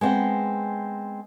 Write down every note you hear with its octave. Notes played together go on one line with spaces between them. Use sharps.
G#3 B3 C4 G#4 F#5